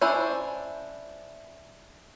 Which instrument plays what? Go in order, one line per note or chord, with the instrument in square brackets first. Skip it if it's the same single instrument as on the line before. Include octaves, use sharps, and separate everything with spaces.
[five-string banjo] C#4 D4 E4 C5